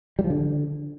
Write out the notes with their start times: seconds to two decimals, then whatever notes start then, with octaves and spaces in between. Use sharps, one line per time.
0.19 G3
0.24 F3
0.30 D3